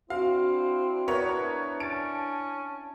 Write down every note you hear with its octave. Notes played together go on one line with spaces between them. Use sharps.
C4 D4 E4 F#4 F5
B3 A#4 C#5
C#4 A5 A6 D7